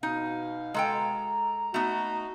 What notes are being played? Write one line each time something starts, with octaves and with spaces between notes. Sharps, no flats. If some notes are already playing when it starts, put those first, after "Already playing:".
B2 D#4 F5
G#3 A4 G5 A#5
A3 B3 D#4 F#4